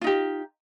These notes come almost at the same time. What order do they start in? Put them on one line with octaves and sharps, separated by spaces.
F4 D#4 G4